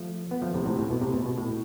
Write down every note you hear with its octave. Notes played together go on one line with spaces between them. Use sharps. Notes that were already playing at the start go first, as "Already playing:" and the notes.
Already playing: F3 A3
B3
F3 A3
A2 C3
A2 C3
A2
B2
A2 C3
B2
B2
A2